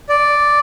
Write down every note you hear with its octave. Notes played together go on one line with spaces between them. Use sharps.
D5